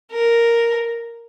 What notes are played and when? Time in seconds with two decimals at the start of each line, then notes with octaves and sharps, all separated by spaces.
0.11 A#4